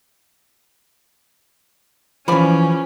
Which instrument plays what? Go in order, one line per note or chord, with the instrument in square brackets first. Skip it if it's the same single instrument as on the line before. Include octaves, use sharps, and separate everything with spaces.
[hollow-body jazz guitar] E3 F3 [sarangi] C#4 [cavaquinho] G#4 D5 B5